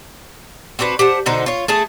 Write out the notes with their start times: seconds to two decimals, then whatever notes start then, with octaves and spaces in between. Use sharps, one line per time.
0.79 C4 D4 F#4 B4
0.99 G4 C5 F#5 A5
1.26 B2 D3 D#4 C5
1.46 F4 C#5
1.68 A3 G#4 A5